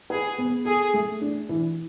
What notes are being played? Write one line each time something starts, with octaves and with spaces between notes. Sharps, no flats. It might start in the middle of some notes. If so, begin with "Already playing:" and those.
G#4 B4
B3
G#4 A4
A3
D4
E3